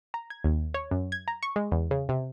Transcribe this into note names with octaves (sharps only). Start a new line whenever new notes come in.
A#5
G#6
D#2
C#5
F#2
G#6
A#5
C#6
G#3
E2
C#3
C3